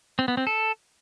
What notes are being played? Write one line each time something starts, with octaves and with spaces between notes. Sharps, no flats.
C4
B3
C4
A4